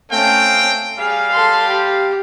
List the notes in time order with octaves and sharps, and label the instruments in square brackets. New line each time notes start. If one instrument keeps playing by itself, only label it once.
[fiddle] A3 C#4 [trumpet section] C4 F5 G5
[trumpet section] G3 F5 [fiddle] G#4
[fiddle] A4 C6
G4